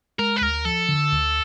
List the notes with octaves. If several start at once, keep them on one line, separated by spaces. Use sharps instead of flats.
G#3 A#4
B4
D2 A#4
F3 A4
D3
D2